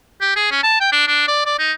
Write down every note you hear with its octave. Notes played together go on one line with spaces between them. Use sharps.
G4
G#4
C#4
A5
G5
D4
D4
D5
D5
D#4